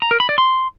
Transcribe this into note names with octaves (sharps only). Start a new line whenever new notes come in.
A#5
A#4
B5
D5
C6